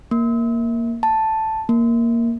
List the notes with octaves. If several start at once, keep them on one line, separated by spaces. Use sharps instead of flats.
A#3
A5
A#3